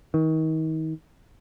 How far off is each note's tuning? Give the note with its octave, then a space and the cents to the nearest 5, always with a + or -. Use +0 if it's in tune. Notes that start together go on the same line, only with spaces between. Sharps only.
D#3 +35